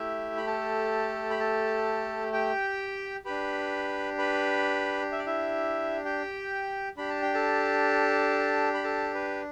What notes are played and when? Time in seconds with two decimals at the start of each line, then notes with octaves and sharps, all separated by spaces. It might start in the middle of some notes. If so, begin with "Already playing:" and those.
Already playing: A3 E4 G4 E5
0.37 B5
0.47 A4 A5
1.30 B5
1.40 A4 A5
2.33 G4 G5
3.25 D4 G4 B4 B5
4.18 B4 B5
5.12 E5
5.18 D5
5.26 E4 E5
6.05 G4 G5
6.97 D4 G4 B5
7.09 A5
7.22 G5
7.34 A4 A5
8.74 B5
8.84 A4 A5
9.14 B4